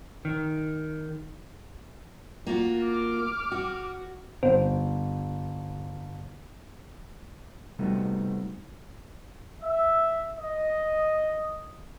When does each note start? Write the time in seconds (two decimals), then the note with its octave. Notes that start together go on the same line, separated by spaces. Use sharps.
0.25 D#3
2.47 A#3 F4 F#4
2.84 D6 F6
3.52 F#4
4.43 G1 C5
7.79 C3 G3 A3 B3 D#4 F#4
9.62 E5
10.38 D#5